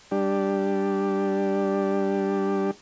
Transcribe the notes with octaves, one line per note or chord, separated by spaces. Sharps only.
G3 D4 G4